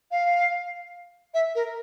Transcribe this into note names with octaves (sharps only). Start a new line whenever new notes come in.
F5
E5
A#4